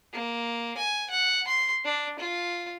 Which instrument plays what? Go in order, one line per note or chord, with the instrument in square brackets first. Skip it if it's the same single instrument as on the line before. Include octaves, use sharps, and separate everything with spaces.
[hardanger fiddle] A#3
G#5
F#5
C6
D4
F4